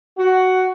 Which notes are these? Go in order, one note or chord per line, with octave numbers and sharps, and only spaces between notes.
F#4